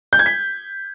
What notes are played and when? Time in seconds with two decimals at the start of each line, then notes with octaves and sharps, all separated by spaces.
0.13 G6
0.19 G#6
0.26 B6